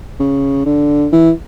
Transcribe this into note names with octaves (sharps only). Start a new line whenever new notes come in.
C#3
D3
E3